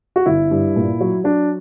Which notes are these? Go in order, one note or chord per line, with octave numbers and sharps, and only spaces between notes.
F#4
G1 E4
G2
A#2
F#3
F#3 D4